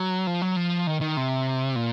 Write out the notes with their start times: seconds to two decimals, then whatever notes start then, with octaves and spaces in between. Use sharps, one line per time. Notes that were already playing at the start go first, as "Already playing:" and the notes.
Already playing: F#3
0.27 F3
0.42 F#3
0.57 F3
0.87 D#3
1.01 D#3
1.17 C3
1.76 A#2